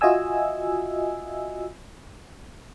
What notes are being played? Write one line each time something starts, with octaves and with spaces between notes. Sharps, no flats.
F4 F#4 D#5 E5 G#5 E6